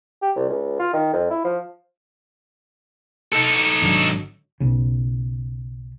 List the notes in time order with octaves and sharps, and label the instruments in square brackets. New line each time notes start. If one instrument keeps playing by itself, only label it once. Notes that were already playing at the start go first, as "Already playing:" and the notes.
[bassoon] G4
C2
C#2
F4
D#3
F2
E4
F3
[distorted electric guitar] D#4 A4
[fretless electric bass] G#1 D3 F#3
B1 C#3